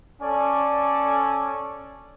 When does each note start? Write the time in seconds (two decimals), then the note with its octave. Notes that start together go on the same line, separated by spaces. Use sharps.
0.22 C#4 A4 D5 G#5